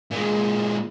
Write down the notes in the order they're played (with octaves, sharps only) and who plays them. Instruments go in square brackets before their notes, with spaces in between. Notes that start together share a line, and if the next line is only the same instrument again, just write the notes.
[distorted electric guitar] A#2 G#3